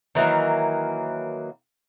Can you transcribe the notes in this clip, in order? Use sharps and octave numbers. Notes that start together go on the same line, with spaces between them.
D#3 E3 F#3 A#3